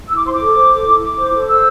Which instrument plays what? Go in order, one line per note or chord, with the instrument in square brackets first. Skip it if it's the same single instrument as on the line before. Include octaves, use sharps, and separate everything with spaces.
[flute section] E4 E6
D6
C5 C6
D6
A4
C5
A4
E4
E4 D6
C5
A4
C5 E6